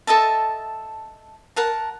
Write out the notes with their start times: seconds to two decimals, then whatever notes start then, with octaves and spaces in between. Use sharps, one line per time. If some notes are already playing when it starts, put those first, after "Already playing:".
0.07 A4 D#5 E5 A5
1.56 A#4 F#5 A5